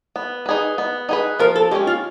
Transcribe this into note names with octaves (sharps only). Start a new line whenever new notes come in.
B3
D#4 G#4 B4
B3
D#4 G#4 B4
F3 A#4
A4
G#3 C#4 G4
F4